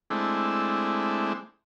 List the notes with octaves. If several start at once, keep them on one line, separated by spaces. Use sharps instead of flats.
G#3 A3 C4 D4 E4